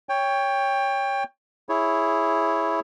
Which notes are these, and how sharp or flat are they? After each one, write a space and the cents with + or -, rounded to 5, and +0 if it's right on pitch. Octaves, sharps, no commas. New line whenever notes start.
C#5 +10 G5 +20
E4 +0 G#4 +0 C#5 +0